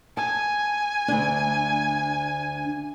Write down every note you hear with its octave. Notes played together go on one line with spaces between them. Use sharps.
G#5 A5
D2 D4